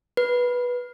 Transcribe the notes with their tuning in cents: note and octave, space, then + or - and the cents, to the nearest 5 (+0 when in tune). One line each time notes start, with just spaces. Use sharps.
B4 -10